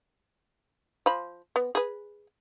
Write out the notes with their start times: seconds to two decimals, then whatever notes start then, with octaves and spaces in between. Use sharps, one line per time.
1.06 F3 B5
1.56 B3
1.75 G#4 B4